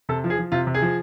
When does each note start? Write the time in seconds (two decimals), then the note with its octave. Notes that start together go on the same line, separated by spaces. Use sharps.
0.09 C3 A4
0.24 F3
0.30 G#4
0.38 F3
0.52 C3 F4
0.67 C3
0.74 G#4
0.82 F3